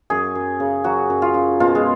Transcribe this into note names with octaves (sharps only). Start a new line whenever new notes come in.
F#2 G#4
F#2
C#3
F#3 F#4
F#2
F4
F#2
B2 F4
G#3